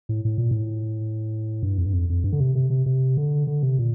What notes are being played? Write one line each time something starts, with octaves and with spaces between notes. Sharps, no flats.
A2
A2
A#2
A2
G2
F2
G2
F2
F2
G2
D3
C3
C3
C3
C3
D3
D3
C3
A#2